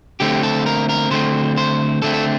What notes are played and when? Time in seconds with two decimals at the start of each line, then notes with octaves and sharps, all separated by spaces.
0.20 D3 A3 C4 G4
0.43 A4
0.66 A#4
0.89 A#4
1.11 D3 A3 C4 C5
1.58 C5
2.02 D3 A3 C4 A4
2.14 A4